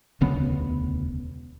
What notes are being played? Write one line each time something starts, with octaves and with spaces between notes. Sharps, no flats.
E1 D2 C#3 B3